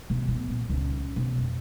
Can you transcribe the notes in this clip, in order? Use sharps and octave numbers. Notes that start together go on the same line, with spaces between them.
B2
B3
A#2
C#2
B2
F2